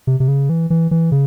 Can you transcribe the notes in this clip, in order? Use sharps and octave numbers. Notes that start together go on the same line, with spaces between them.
C3
C3
C#3
E3
E3
E3
C#3